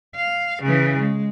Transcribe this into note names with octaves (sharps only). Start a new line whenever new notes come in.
F5
C#3 E3
G#3